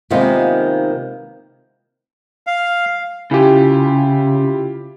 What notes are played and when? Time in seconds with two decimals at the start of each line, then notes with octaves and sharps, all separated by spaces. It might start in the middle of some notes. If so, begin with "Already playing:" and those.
0.10 C3 D#3 G#3 A#3 B3 F4
2.47 F5
3.31 C#3 E4 F4 G4